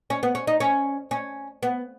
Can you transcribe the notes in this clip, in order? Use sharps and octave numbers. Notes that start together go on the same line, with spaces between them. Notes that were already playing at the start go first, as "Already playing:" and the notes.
C#4
B3
C#4
D#4
C#4
C#4
B3